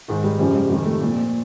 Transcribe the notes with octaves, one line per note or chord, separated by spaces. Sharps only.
G#2 D#3
G3
F#2 C#3 F3 G3
G3
F2 C3 D#3 G3
A3
A#2 F3